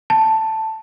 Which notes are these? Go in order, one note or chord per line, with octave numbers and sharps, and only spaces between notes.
A5